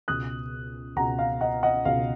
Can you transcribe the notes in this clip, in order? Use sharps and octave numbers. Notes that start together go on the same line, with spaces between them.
C#2 B2 D#6 F#6
C#2 B2 F#5 A#5
F5
D#5 F#5
D#5 F#5
C#2 B2 F5